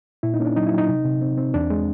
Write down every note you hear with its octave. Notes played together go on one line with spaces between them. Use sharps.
A#2 E4
D#4
A#3 C#4
D4
F#3 D#4
E4
F#3
D#4
C3
C3
C4
C4
E2 D4
G#3